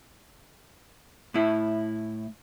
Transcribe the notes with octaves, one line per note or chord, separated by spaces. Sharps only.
A2 E4